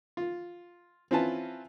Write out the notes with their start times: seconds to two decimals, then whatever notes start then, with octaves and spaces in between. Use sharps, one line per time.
0.17 F4
1.11 C4 C#4 E4 F4 B4 A5